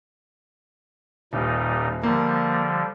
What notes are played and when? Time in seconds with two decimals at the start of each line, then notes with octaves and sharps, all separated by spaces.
1.33 D#1 A#2 G3 D#4
2.03 D3 F3 G3 A#3